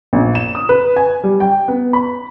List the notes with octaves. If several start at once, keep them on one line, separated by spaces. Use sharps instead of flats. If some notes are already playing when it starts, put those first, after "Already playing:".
A#1
E7
D#6
B4
G#5
G3
G5
B3
B5